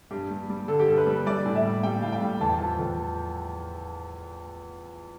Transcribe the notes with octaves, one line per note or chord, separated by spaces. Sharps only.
G2 G4
G3
G3
D3 A4
G4
G2 A4
B4
G3
G3 D5
A2
E5
G3
G3 G5
A2 F5
G5
G3
E2 A5
G5
F3 A5
E2